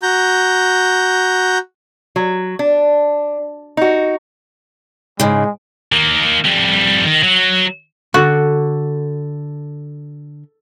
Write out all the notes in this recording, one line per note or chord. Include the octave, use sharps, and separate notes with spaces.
F#4 A#5 G6
F#3
D4
D#4 F#4
G#2 C#3 G#3
D#3 A#3
F2 G3
D#3
F#3
D3 F#4 A4